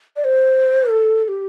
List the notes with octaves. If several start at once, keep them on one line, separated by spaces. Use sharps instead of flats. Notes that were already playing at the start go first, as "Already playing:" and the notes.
D5
C5
A4
A4
G4